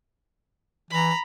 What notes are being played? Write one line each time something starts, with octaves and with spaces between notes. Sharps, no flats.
E3 A#5 B5